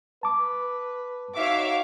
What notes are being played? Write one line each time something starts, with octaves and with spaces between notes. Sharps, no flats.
B4 A5 D6
D#4 F#4 C#5 E5 F5 D6